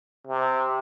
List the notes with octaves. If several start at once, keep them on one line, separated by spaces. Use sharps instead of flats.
C3